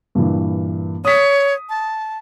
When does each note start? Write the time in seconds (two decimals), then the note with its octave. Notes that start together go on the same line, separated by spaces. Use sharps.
0.15 G2 A#2 E3
1.05 C#5 D#6 B6
1.69 A5